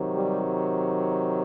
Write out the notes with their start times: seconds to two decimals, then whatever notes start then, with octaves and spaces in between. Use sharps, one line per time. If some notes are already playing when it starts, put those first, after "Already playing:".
Already playing: C3 D#3 F#3
0.15 G3